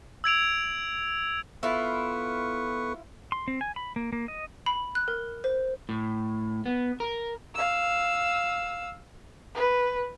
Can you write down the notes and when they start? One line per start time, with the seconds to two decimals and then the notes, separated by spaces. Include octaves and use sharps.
0.24 E6 G#6 D7 F7
1.63 B3 E4 F4 A4 B4 C#6
3.32 C6
3.48 C4
3.61 G#5
3.76 B5
3.96 A#3
4.13 A#3
4.28 D#5
4.66 B5
4.95 F#6
5.08 A#4
5.44 C5
5.89 A2
6.66 B3
7.00 A#4
7.55 F5 E6
9.55 B4